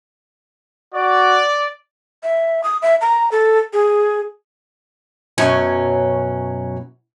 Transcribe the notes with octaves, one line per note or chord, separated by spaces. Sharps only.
F#4 D5
E5
D#6
E5
A#5
A4
G#4
F#2 B2 F#3 C#4